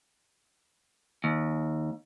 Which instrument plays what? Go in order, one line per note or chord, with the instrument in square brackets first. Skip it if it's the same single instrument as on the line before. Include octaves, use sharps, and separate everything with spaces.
[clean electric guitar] D#2